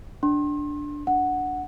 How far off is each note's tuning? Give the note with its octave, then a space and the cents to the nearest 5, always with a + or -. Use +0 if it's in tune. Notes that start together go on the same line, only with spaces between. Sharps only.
D4 +0 C6 +35
D4 +0 F#5 +0